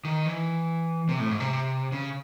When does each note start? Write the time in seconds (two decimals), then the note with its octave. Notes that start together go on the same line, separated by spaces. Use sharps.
0.05 D#3
0.26 E3
1.09 C3
1.19 A2
1.30 G#2
1.40 C3
1.92 C#3